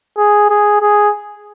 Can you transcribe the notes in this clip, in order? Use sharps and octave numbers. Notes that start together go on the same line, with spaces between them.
G#4
G#4
G#4